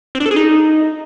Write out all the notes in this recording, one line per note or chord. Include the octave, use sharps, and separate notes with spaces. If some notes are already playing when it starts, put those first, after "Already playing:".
C4
D4
A4
G#4
D#4